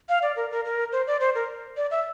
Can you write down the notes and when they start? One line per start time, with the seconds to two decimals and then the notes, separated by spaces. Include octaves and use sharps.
0.09 F5
0.22 D5
0.36 A#4
0.51 A#4
0.65 A#4
0.92 C5
1.07 D5
1.20 C5
1.35 A#4
1.77 D5
1.91 E5